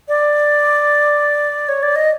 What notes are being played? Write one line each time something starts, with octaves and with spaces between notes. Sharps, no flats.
D5
C#5
D5
D#5